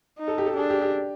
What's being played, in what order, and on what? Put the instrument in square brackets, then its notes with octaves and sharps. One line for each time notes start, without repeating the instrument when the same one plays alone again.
[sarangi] D#4
[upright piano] A4
G4
A4
[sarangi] D4 [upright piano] G#4
[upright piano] G4
G4